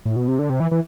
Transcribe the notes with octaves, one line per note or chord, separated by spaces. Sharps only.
A2
B2
C3
D3
C3
E3
E3